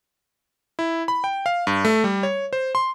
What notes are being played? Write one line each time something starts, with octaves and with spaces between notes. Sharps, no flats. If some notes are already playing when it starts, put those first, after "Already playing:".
E4
B5
G5
F5
G2
A3
G3
C#5
C5
C6